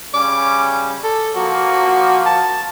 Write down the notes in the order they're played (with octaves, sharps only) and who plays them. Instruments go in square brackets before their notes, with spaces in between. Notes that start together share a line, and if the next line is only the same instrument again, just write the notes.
[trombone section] C#3 G3 C#4 [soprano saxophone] D6
[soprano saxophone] A4
[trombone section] F3 A#3 [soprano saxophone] F#4
[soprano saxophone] A5